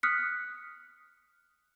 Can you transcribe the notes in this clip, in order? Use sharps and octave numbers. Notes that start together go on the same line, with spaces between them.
D#6 F6 F#6 B6 C#7